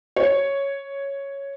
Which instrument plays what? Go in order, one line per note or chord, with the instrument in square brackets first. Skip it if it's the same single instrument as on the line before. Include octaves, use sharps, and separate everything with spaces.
[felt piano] C#5